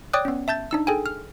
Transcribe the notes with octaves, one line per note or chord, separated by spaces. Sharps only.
C#5 D5 G5 D6 D#6 F#6
B3 C#4
E5 A5 G6 A6
D4 D#4 E6
G#4 A4 G5 G#5
F6